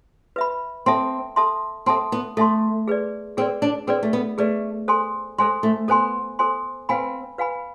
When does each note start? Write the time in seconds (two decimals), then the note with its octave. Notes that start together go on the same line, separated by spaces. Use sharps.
0.36 B4 E5 B5
0.86 C4 A4 E5 A5 C6
1.36 A4 E5 A5 C6
1.86 C4 A4 E5 A5 C6
2.12 B3
2.37 A3 A4 E5 A5 C6
2.88 G#4 B4 D5
3.37 C4 G#4 B4 D5
3.62 D4
3.87 C4 G#4 B4 D5
4.03 A3
4.13 B3
4.38 A3 G#4 B4 D5
4.88 A4 C5 G#5 C6
5.38 G#3 A4 C5 G#5 C6
5.63 A3
5.88 B3 A4 C5 G#5 C6
6.39 A4 C5 G#5 C6
6.89 C4 B4 F5 G#5 B5
7.38 B4 F5 G#5 B5